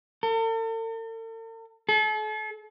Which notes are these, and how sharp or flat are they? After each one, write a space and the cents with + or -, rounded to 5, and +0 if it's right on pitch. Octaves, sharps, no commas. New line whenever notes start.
A4 +45
A4 -40